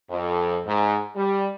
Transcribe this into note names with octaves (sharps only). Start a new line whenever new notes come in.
F2
G#2
G3